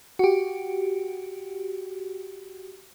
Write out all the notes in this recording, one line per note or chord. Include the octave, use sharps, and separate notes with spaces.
F#4 G4